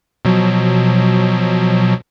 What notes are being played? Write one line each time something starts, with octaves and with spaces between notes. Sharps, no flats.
B2 F3 F#3